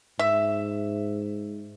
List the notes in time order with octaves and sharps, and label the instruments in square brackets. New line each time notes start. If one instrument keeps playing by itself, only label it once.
[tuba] G#2 [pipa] E5